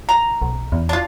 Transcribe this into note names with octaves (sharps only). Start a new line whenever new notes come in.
A#5
B1
E2
D4 F4